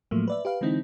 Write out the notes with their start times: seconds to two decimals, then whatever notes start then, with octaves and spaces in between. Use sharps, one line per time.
0.11 A2 F3 F#3 A3 A#3
0.28 B4 D5 E5
0.45 G4 B4 F5
0.61 D3 E3 G#3 C4 D#4 E4